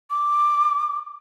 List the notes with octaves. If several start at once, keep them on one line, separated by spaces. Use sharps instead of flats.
D6